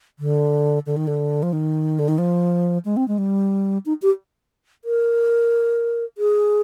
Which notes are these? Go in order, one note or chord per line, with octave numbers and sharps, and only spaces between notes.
D3
D3
D#3
D3
F3
D#3
D3
D#3
F3
G#3
C4
G#3
G3
D#4
G4
A#4
G#4